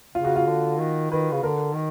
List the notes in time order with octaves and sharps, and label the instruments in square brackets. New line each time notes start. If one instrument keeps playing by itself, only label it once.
[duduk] C#3 [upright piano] F4
[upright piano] F#4
F4
[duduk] D3
D#3
[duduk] D#3 [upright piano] B4
[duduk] C#3
[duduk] D3 [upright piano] A#4
[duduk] D#3